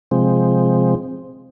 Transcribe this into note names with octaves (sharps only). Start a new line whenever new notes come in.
C3 F3 G#3 C4